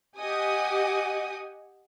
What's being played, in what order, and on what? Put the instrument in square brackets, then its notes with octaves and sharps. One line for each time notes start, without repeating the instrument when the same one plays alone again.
[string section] G4 D#5 F#5 G#5 D#6